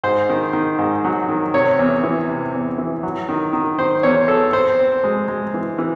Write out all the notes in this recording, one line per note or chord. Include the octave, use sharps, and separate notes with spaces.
G#2 C5
D#3
D#3
G#2
F#3
D#3
C3 C#5
E2
E3
C3
E2
E3
F#3
D#3
D#3
D#3 C5
E2 C#5
E2 A4
C4 C5
C4
G#3
G#3
E3
E3